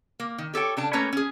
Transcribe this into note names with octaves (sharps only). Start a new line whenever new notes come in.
A#3
D#3
G4 A4 C#5 G5
C#3 D4 A5
A3 A#3 C#4 B4 C#5 A#5
C#4 G#4